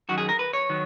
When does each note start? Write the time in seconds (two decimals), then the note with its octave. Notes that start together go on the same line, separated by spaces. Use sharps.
0.09 F#2 D#3 F#3 F#4
0.18 G#4
0.29 A#4
0.39 B4
0.53 C#5
0.70 D#3 F#3